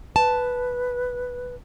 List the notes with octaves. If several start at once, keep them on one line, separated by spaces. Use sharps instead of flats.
B4 A5